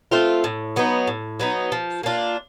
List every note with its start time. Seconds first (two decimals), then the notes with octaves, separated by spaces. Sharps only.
0.11 A3 C4 F4
0.44 A2
0.76 F#3 B3 D#4
1.07 A2
1.40 F#3 B3 D#4
1.72 F3
2.03 A#3 D4 F4